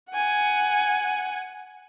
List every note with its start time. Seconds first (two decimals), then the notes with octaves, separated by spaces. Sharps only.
0.10 F#5 G#5